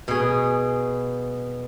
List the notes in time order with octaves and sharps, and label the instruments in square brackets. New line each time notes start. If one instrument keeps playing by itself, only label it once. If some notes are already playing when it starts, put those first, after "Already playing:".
[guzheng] B2 G#4